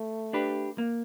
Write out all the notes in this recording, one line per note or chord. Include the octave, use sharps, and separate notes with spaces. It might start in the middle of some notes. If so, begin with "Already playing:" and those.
Already playing: A3
D4 G4 B4
A#3